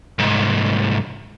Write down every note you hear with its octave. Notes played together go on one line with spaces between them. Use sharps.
C2 G#2